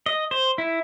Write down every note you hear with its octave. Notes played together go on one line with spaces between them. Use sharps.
D#5
C5
E4